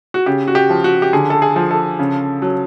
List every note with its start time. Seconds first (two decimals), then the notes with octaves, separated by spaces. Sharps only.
0.14 F#4
0.26 C#3 G4
0.48 F#4
0.55 G4
0.70 F3
0.84 F#4
1.02 G4
1.13 D3 G#4
1.30 A4
1.42 G#4
1.56 F3
1.71 A4
1.99 C#3
2.42 F#3